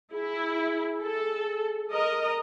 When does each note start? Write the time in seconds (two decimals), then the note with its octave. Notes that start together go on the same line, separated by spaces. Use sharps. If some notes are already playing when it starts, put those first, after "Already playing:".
0.13 E4 G#4
1.02 A4
1.91 A#4 D#5